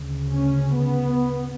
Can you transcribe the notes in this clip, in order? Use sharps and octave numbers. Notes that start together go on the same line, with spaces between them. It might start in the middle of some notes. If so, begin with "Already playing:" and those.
Already playing: D2 C#3
C#4
B3